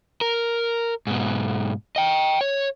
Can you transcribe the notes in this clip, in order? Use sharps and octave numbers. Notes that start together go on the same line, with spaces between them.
A#4
G#2 B2
D#5 G5
C#5